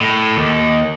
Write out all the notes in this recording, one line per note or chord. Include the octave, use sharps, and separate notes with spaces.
A2
D#2